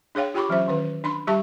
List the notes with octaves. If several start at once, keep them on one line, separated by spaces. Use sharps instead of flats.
D4 G#4 C#5 F5 G5
F4 G4 G5 B5 C#6 D6
E3 F#3 C#4 C5 E5
D#3 C#4 B4
D4 B5 C6
G3 G4 E5 A5 C#6